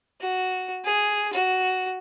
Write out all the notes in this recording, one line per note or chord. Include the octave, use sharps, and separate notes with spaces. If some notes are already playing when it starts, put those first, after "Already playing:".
F#4
G#4
F#4